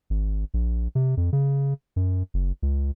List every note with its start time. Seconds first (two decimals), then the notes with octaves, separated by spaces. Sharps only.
0.10 G#1
0.54 A#1
0.95 C3
1.17 F2
1.33 C#3
1.96 F#2
2.34 F#1
2.63 C#2